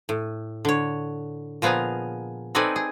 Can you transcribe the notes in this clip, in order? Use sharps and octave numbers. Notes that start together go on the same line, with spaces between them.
A2
D3 C#5
A#2 F3 B3 G#4 G#5 A#5
C4 D#4 A4 B4 D5 G#5
G#4